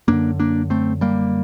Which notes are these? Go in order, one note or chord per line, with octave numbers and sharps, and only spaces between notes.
F#2 D3 A#3 D4
A#3 D4
A3 C4
G3 A#3